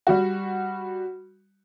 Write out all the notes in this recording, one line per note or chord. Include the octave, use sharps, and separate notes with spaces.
G3 F#4